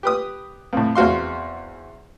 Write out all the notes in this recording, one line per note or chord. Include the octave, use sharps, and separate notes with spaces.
G4 B4 D#6
F2 A2
E2 C4 F#4 F5 C6